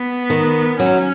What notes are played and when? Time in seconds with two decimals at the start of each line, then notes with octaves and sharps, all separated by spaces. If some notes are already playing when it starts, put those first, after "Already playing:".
Already playing: B3
0.30 D#3
0.79 F#3 C#4